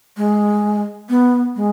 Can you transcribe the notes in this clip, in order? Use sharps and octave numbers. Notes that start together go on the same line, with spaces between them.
G#3
B3
G#3